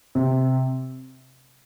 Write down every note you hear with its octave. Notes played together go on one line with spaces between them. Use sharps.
C3